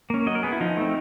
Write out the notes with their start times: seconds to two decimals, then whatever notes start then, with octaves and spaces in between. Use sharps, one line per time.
0.10 A#3 C#4
0.27 F#3 D#5
0.35 A#4
0.43 B3 G#4
0.52 E4
0.60 F3 D#4
0.77 A3 C4